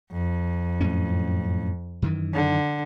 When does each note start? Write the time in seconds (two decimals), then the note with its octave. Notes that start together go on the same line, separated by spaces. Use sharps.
0.11 F2
0.81 F#2 A2 C#4
2.02 F#2 D#3 E3
2.34 D3